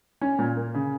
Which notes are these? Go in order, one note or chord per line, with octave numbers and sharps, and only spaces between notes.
C#4
A#2
A#3
C#3